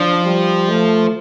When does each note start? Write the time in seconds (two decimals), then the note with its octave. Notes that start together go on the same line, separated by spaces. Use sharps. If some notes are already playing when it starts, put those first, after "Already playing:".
Already playing: F3 D4
0.25 G3
0.70 A3